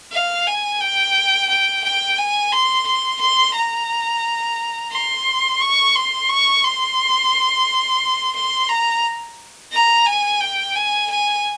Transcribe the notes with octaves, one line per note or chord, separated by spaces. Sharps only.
F5
G#5
G5
G5
G5
G#5
C6
C6
C6
A#5
C6
C#6
C6
C#6
C6
C6
A#5
A#5
G#5
G5
G#5
G#5